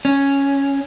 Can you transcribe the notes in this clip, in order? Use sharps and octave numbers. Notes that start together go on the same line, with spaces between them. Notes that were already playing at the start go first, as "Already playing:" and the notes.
C#4